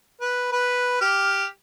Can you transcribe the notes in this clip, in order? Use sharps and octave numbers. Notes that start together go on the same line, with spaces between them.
B4
B4
G4 F6